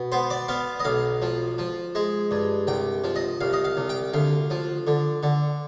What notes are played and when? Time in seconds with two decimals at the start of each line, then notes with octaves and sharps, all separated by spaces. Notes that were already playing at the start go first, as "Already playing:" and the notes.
Already playing: B2
0.12 B3 C5
0.30 D5
0.48 B3 F5
0.80 D#5
0.85 B1 F5
1.22 F3
1.58 F3
1.95 G#3
2.31 G2
2.67 C2 G5
3.04 F3
3.16 D#5
3.41 C2 F5
3.53 D#5
3.65 F5
3.77 C2
3.89 G5
4.14 D2 F5
4.50 F3
4.87 D3
5.23 D3